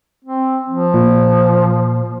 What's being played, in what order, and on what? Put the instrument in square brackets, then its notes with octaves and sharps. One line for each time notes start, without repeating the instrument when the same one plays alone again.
[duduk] C4
F3
[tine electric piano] A#2